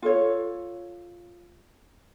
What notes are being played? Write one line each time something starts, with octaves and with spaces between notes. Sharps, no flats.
F4 A4 C#5